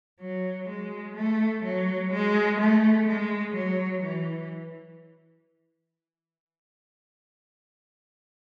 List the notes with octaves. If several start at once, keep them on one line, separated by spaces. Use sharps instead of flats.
F#3
G#3
A3
F#3
G#3
A3
G#3
F#3
E3